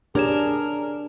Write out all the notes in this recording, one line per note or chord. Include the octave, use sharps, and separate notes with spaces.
D4 G4 G#4 A#4 C#5 E7